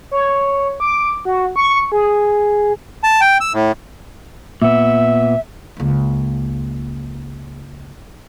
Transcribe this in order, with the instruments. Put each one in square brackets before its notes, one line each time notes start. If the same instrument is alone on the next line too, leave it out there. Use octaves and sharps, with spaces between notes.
[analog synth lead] C#5
D6
F#4
C#6
G#4
[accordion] A5
G5
E6
A2
[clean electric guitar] A#2 B3 [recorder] E5
[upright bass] C#2 A#3